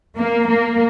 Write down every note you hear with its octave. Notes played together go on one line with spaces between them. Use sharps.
A#3
A#3